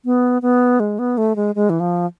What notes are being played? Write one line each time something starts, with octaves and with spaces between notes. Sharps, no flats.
B3
B3
G#3
B3
A3
G#3
G#3
E3
F3